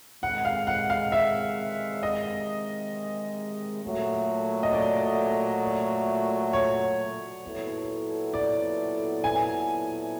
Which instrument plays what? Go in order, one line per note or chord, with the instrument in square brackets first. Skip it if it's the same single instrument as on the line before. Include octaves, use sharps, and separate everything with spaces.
[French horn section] C3 D#3 G#3 [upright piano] F#5
[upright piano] F5
F#5
F5
E5
D#5
[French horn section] A#2 F#3 A3
[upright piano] D#5
D5
C#5
[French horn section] A#2 F#3 B3 E4 A4
[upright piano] D5
G#5